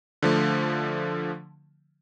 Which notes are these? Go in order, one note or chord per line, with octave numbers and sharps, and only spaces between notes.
D3 F3 A3